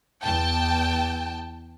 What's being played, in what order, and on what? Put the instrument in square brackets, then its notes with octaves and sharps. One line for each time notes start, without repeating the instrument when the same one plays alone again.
[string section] E2 G5 A5